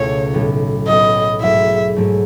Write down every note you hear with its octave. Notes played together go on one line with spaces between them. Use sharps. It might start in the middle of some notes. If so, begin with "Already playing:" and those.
Already playing: C#2 B2 A3 E4 C#5
B1 A2 F#3 B3 E4
B1 A2 F#3 B3 E4 D#5
G#2 F#3 A3 E4 E5
G#2 F#3 A3 E4